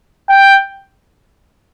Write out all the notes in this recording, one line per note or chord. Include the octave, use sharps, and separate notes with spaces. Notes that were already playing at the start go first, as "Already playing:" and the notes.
G5